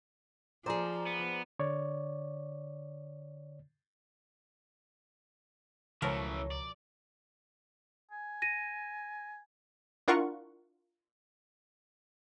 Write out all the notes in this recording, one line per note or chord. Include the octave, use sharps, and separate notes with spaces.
F3 G#4 C5 D5 A#5
B3
D3 C#5 D5
C#2 B2 E3 F3 A3 A#4 C#5 A#5
D5
G#5
A#6 D#7
D4 E4 F4 A#4 F#5 C#6